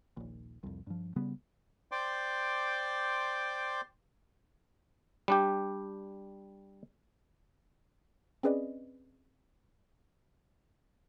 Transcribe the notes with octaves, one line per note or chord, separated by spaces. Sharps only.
D#1 A#1
C2 F2
G2 F3
C#3 G3 B3
C5 D5 G5 C6 D6
G3 D4 G4
C4 C#4 G#4 B4 D5 D#5